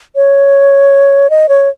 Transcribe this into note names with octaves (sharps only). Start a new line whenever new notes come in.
C#5
D#5
C#5